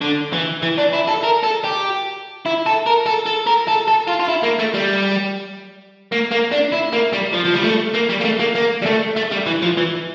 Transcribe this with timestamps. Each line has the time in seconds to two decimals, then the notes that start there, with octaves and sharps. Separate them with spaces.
0.02 D3
0.33 E3
0.63 E3
0.78 D4
0.94 E4
1.08 A4
1.24 A#4
1.44 A4
1.64 G4
2.46 E4
2.66 A4
2.86 A#4
3.06 A4
3.26 A4
3.47 A#4
3.68 A4
3.88 A4
4.08 F4
4.20 F4
4.29 E4
4.44 A#3
4.59 A3
4.74 G3
6.12 A#3
6.32 A#3
6.52 D4
6.72 E4
6.93 A#3
7.13 G3
7.33 F3
7.44 F3
7.54 G3
7.64 A3
7.95 A#3
8.10 G3
8.21 A#3
8.25 A3
8.40 A#3
8.55 A#3
8.82 G3
8.86 A3
9.17 A3
9.32 G3
9.46 E3
9.62 F3
9.77 E3